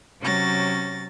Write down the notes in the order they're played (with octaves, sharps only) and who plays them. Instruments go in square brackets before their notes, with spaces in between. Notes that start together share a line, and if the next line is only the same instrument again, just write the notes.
[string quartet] C3 F#3 C#4 A6 A#6